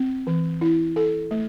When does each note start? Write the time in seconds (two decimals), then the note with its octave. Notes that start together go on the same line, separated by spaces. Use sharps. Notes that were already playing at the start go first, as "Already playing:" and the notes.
Already playing: C4
0.27 E3
0.61 E4
0.96 A4
1.31 A3